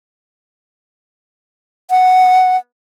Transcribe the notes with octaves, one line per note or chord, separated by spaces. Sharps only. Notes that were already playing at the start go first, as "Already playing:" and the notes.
F#5